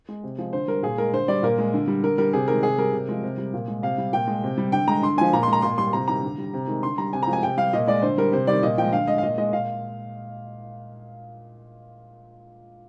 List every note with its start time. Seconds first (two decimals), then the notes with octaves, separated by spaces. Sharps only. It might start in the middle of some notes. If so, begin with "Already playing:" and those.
0.09 G#3
0.23 C3
0.38 F3 G#3
0.53 D3 C5
0.68 G3 A#4
0.83 A#2 G#4
0.98 G#3 A#4
1.13 D3 C5
1.28 G3 D5
1.43 A#2 A#4
1.58 G#3
1.74 D3
1.88 G3
2.03 D3 A#4
2.18 G3 A#4
2.33 C3 G#4
2.48 D#3 G#3 A#4
2.62 C3 G#4
2.78 G3 A#4
2.92 C3
3.09 F3 G#3
3.23 C3
3.37 G3
3.53 A#2
3.68 G#3
3.82 C3 F5
3.98 G3
4.13 A#2 G5
4.27 G#3
4.43 C3
4.58 G3
4.72 D3 G5
4.87 G#3 A#5
5.02 D3 C6
5.17 F3 G#3 G#5
5.33 A#2 A#5
5.43 C6
5.48 G#3 A#5
5.62 A#2 C6
5.78 G3 C6
5.93 C3 A#5
6.07 D#3 G3 A#5
6.22 D3
6.38 G3
6.53 C3
6.67 D#3 G#3
6.82 D3 C6
6.98 G3 A#5
7.13 C3 G#5
7.23 A#5
7.27 F3 G#3
7.33 G#5
7.42 C3 G5
7.57 G3 F5
7.73 A#2 D#5
7.87 G#3 D5
8.02 D3 C5
8.18 G3 A#4
8.32 C3 C5
8.47 D#3 G3 D5
8.62 A#2 D#5
8.78 F3 G#3 G5
8.92 D3 F5
9.07 G#3 D#5
9.18 F5
9.23 A#2 D#5
9.38 G#3 D#5
9.53 A#2 F5